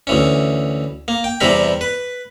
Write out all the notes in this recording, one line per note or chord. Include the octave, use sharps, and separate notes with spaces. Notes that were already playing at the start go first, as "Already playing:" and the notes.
D2 E3 C#4
A#3
G5
E2 C3 E3 G3 A#4 B5
B4